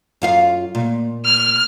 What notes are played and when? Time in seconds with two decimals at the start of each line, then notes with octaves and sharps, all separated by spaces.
0.22 F#2 F4 F5
0.75 A#2
1.25 F6